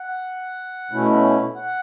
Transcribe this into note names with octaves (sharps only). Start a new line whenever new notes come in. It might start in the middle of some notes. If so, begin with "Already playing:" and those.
Already playing: F#5
B2 A3 C#4 E4
F#5